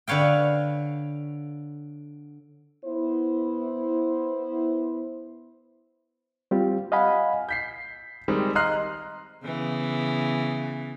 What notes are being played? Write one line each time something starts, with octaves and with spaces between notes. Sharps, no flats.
D3 B4 C#5 F5 G5
B3 E4 C5
G3 C4 F4 G4
D#5 F5 F#5 G#5 B5
G6 B6 C7
D#3 G3 G#3 C4
D#5 A#5 C6 F6 F#6 C7
C#3 E3 B3